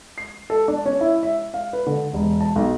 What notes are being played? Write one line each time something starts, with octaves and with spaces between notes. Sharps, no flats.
C7
A4
D4
C#4
E4
E5
F5
B4
D3
E1
A5
B1